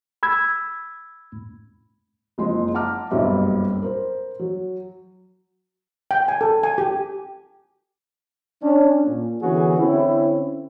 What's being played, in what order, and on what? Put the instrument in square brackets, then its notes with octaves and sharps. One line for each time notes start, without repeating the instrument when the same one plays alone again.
[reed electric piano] B5 E6 G#6
[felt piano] F#1 F3 G#3 C4 C6
F#5 A5 A#5 D6 F6
F#1 B1 G2 G3 C4 E5
A#4 C5
F#3
[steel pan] G5
G#5
A4
G#5
G4
[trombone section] C#4 D4
A#2
D3 E3 B3 C#4 F#4 G#4
D3 C4 C#4 E4